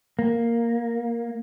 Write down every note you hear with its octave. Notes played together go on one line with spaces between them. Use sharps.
A#3